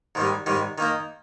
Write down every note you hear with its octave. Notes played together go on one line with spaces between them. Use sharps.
G#2 D#3 G3
G#2 D#3 G3
D#3 A#3 D#4